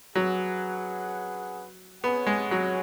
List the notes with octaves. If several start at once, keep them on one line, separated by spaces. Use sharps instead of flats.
F#3 C#4 G#4 B4 F#5
B3 C#4 G#4 C#5 F#5
G#3
F#3